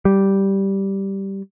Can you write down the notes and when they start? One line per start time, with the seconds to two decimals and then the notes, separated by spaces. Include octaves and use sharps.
0.05 G3